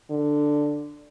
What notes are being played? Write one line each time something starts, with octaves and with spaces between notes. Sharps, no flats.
D3